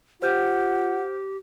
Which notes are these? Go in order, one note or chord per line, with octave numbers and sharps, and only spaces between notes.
F4 G4 C5 F#5 F6 G6